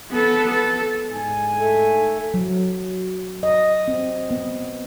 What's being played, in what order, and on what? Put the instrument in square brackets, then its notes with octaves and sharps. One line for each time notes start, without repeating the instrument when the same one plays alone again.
[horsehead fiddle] B3 A4
A4
[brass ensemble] G#2 D3 G#5
[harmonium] A3
[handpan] F#3
D#5
C4
B3